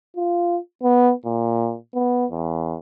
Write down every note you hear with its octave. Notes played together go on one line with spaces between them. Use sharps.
F4
B3
A#2
B3
E2